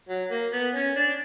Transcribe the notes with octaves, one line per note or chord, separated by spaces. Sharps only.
F#3
A#3
B3
C#4
D4